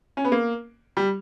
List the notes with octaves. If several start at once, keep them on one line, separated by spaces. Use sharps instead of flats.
C#4
B3
A#3
G3